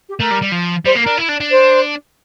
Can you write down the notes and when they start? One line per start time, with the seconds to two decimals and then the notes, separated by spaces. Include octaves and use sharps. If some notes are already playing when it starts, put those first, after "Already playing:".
0.09 G4
0.19 A3 A#4
0.31 G3
0.41 G3
0.52 F3
0.85 G3 C5
0.95 A#3
1.01 A#4
1.06 D4
1.17 E4
1.29 D4
1.40 D4
1.50 C5